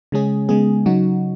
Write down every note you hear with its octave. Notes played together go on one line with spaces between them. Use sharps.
C#3 G#3 C#4 G#4
C#3 G#3 B3 G#4
C#3 F#3 D#4 F#4